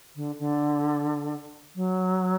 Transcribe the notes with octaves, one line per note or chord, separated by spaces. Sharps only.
D3
D3
F#3